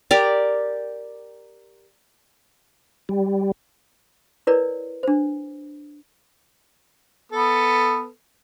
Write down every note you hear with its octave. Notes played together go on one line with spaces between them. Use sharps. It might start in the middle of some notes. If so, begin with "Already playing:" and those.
G4 A#4 D5
G3
E4 A#4 B4 C#5 D5
D4 C5
B3 A4